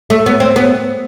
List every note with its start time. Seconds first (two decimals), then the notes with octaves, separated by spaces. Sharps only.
0.10 A3
0.26 B3
0.40 C4
0.56 B3